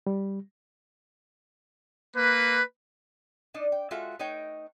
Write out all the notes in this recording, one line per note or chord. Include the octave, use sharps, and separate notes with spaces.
G3
A#3 B4
D4 D#4 D5 D#5
G5
G#3 F4 F#4 A4 E5 F#5
A3 D#4 B4 C#5 D#5 G5